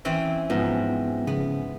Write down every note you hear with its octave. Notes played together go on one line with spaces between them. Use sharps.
E3 C4 C#4
G#2 F3 B3
C#3 B3